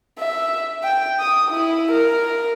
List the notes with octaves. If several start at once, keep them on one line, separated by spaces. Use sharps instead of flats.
E5
G5
D#6
E4
A#4